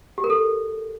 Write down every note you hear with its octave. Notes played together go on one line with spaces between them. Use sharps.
G4
A#4
A4